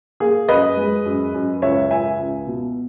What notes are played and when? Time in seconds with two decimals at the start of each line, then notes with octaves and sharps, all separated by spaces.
0.20 A#3 G#4
0.49 F#2 B4 D#5
0.77 G#3
1.05 F#2
1.34 F#2
1.62 C#2 C#5 E5
1.91 C#2 E5 G#5
2.19 C#2
2.47 B2